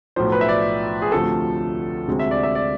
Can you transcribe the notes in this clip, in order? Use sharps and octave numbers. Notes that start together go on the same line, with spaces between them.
B1 A2 F3 C5
B4
E5
D5
G#4
D2 C3 F3 A3 A4
D2 C3 G#3 C4
E5
D5
E5
D5